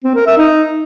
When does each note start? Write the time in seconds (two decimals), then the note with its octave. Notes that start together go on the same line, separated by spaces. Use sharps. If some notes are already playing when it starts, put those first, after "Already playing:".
0.04 C4
0.15 A#4
0.26 E5
0.38 D#4